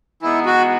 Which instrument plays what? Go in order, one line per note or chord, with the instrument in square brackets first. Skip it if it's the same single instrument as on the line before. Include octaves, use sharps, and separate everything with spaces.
[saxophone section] E3 G#3 B3 D#4 [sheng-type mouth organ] E4
[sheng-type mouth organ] F#4